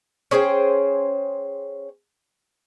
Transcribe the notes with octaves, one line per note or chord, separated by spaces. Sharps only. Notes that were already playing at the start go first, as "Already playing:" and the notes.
C#4 G#4 C5 G5